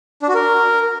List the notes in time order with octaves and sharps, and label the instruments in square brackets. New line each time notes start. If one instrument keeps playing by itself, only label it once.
[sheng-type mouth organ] D4
F#4
A#4